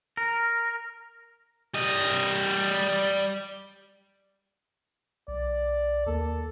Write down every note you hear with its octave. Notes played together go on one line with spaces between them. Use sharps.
A#4
G3 D#5
B1 D5
D#2 A#3 A4 A#4